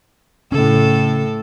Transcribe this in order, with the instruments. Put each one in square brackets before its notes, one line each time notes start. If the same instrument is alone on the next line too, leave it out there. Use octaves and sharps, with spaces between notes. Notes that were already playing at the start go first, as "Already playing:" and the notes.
[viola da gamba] A2 A4 [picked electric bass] C#3 C#4